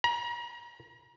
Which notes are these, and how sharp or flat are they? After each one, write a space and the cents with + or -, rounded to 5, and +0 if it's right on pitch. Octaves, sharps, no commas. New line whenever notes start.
A#5 +35